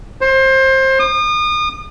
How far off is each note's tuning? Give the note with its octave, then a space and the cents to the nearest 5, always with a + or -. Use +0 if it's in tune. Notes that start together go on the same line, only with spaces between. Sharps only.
C5 +25
D#6 -35